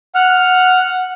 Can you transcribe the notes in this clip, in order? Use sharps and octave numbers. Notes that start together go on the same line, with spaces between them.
F#5 F6